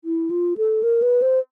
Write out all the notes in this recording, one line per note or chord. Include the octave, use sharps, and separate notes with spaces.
E4
F4
A4
A#4
B4
C5